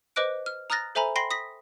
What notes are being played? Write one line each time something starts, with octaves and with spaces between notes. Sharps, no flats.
B4 C5 D#5 D6 F#6 D7
F6
A#5 D#6 F6 F#6 A6 A#6
A4 C5 E5 G#5 A#5 B5
G5 B5 C6 A#6 C7
D#6 A#6 B6